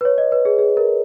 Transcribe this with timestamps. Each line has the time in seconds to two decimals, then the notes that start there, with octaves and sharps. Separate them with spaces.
0.01 B4
0.05 C#5
0.18 D#5
0.32 B4
0.45 G#4
0.59 G#4
0.77 A#4